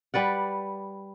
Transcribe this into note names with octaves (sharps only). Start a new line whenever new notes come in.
G3 B4 D5 F#5